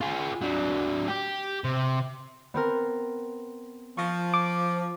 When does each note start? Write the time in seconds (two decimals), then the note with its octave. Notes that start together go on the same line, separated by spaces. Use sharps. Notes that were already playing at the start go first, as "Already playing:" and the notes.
0.01 F4 G#4
0.41 F#3 D4
1.08 G4
1.64 C3
2.54 B3 C4 A#4
3.97 F3 C#6 A#6
4.34 D6